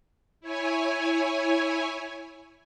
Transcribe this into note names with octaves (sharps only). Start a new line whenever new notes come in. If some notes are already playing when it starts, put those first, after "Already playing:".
E4 C#5 G#5